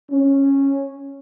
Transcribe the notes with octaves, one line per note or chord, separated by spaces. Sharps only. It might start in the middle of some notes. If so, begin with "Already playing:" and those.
C#4